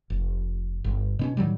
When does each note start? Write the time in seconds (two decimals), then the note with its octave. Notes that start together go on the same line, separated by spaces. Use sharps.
0.10 F1
0.84 G1
1.19 B2 C4 C#4
1.37 A2 D#3 F#3 G3